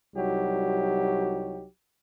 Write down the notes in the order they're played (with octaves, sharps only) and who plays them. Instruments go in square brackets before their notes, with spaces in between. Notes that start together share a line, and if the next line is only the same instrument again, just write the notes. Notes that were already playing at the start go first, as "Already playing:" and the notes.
[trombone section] C2 F#3 G3 D#4 F#4 G4